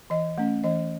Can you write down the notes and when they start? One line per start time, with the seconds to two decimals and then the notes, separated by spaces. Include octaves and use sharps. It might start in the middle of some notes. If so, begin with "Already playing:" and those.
0.10 E3 D#5
0.38 A3 C#4
0.64 E3 D#5